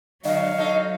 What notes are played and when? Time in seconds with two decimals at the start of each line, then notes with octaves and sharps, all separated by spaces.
0.25 D3 F#3 D#5 F5
0.58 D#4 A4